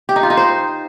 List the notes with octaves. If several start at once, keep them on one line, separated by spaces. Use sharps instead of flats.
G4
D#4
F4
D#4
C5